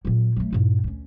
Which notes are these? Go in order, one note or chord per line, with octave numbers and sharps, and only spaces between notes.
A#2 F#3
F#3 A3
G2 A#2
D2 C#4